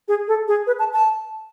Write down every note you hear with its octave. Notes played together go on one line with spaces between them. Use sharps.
G#4
A4
G#4
B4
A5
A5